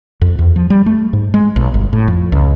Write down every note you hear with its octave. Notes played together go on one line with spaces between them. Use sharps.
F2
E2
F3
G3
A3
G#2
G#3
B1
G1
A2
F2
C#2